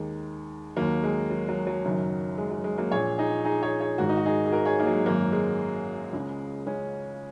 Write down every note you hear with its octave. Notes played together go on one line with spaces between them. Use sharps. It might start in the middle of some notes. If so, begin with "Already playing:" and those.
Already playing: D#2 D#3 G#3
D#2 D#3 F#3 A#3
G#3
F#3
F#3
F#3
F#1 F#2 D#3
G#3
F#3
G#3
F#3 A#3
A#1 A#2 G#4 C#5
D#4 G#4
D#4 G#4
G#4 C#5
G#4 C#5
G#1 G#2 D#3 F#4 A#4
D#4
F#4
D#4 G#4
G#4
F#4 A#4
G#4 C#5
A#3 D#4
F#3
G#3
G#1 F#2 D#3 F#3 A#3
G#3
C#2 C#3
G#3 C#4